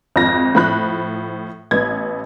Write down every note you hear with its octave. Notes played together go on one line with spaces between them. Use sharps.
G#1 F2 F4 A#6
A2 F3 B5 F#6
A1 B3 G#6